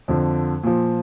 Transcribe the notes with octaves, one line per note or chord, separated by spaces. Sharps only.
F2 D3 F3
A#2 F3